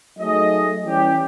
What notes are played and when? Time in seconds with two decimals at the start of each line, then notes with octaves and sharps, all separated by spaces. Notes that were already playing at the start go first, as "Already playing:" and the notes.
0.18 F#3 A3 D#4 G#4 D#5
0.85 E3 G3 C#4 G4